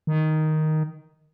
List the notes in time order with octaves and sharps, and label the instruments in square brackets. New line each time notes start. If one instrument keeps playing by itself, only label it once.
[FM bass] D#3